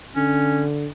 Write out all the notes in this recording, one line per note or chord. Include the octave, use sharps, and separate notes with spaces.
D3 C#4